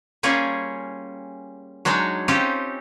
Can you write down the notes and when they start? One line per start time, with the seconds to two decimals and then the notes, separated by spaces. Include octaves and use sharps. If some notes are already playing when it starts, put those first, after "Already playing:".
0.23 G3 A#3 C#4 F4 G#4
1.85 F#3 G#3 D4 D#4 C#5
2.28 C4 C#4 D#4 F4 G4